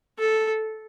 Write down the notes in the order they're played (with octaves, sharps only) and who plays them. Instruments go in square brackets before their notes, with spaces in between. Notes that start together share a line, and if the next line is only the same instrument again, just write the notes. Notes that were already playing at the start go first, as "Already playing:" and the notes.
[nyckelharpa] A4